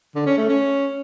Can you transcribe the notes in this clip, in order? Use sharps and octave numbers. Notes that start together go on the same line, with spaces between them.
D3
C#4
A3
C#4